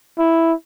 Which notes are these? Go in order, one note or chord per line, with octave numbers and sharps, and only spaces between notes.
E4